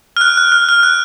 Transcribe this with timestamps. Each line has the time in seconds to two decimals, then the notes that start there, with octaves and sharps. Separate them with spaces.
0.17 F6
0.21 F#6
0.38 F#6
0.52 F6
0.69 F6
0.83 F#6